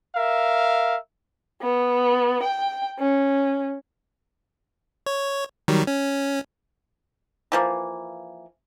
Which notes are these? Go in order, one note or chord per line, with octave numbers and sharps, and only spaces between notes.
A#4 E5 F5
B3
G5
C#4
C#5
D#3 F#3 G3
C#4
E3 F3 A#3